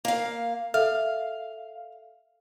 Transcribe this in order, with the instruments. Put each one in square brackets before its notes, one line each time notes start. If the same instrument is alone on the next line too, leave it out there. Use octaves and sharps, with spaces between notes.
[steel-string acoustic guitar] A#3 F5
[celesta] A4 E5 F6 [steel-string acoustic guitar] F5